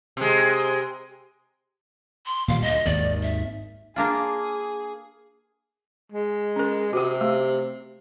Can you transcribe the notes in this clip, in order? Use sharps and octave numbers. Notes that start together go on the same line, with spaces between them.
C3 G#3
C6
A#2 D#3 G3 F5
D2 D#5
G#1 D#2 D#3 D5
E5
A#3 D4 F4 G#4
G#3
C#4 A#4
C3 F#4 G4
A3